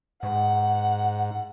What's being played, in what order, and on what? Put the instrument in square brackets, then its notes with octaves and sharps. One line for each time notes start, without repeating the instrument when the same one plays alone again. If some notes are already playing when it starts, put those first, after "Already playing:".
[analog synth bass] G#2 [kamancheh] F#5